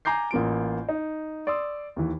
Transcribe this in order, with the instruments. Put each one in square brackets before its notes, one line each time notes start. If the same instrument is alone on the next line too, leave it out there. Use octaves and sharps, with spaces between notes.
[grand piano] G#5 A#5 D6 G6 C7
A1 A#3 F4 D7
D#4
D5 C6 D#6 E6
D#2 E3